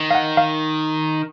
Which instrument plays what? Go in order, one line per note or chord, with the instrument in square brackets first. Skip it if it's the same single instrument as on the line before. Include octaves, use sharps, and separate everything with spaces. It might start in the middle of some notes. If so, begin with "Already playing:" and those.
Already playing: [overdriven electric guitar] D#3
[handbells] F5
F#5
F5